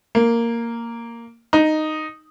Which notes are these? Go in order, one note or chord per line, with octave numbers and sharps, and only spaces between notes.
A#3
D#4